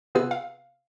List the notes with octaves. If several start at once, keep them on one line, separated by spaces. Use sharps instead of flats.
C3 B3 F4 G#4 B4 E6
F5